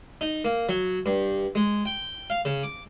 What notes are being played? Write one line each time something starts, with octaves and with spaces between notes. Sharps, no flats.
D#4
A#3
F#3
G2
G#3
G5
F5
C#3
D6